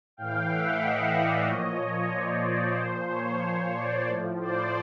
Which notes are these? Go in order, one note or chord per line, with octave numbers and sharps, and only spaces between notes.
A2 E3 F5 G5
E5 F#5
D#5 F5
D5 E5
A#2 F3 C#5 D#5
C5 D5
C#5
A#2 F3 C5
C#5
C5 D5
A2 F3
C5 D5